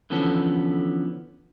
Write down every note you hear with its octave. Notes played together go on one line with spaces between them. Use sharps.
D3 E3 F3 B3 C#4 A4